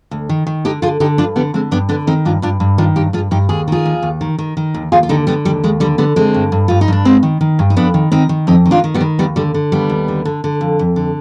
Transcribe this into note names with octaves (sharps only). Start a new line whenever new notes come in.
D2
D#3
D#3
D3 D#4 G4
D3 F4 G#4
D3 D#4 G4
G2 D4 F4
D3 G3 B3
D3 G#3 C4
G2 B3 D4
D3 B3 D4
D#3 C4 D#4
G2 D4 F4
G2 D4 F4
G2
D#3 D4 F4
G2 D#4 G4
G2 F4 G#4
G2 D#4 G4
D#2 G#4
D#3 F4 G#4
D#2
D#2
D#3
D#3
D#3
D#2
D#2 F4 G#4
F4
D3 D#4 G4
D3 G3 B3
D#2 G3
D#2 G#3
D3 G3
D3 G3 B3
D3 G#3 C4
G2
G2
G2 F4
D#4
G2 D4
G2 G#3 C4
D#3
D#3
G2
D#4
F2 B3 D4
D#3
D#3 C4 D#4
D#3
F2 C4 D#4
D#3
D4 F4
D#3
G3 B3
D#3
D#2 G3 B3
D3 G3
D3
D#2 G3 B3
D#2
D3
D3
D3
F2
F2
D3